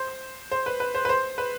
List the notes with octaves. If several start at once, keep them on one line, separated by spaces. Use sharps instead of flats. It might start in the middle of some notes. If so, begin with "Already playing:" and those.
Already playing: C5
C5
B4
B4
C5
B4
C5
B4